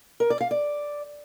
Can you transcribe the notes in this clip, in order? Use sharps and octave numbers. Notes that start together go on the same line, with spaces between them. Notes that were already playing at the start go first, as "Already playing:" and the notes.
A#4
D5
F5
D5